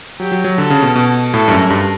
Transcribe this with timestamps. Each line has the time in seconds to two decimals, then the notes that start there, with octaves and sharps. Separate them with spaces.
0.20 F#3 G4
0.32 F#3
0.45 F#3
0.57 D3 A4
0.70 C#3
0.83 B2
0.95 B2
1.33 A2 A4
1.48 G2
1.51 F#2
1.70 G2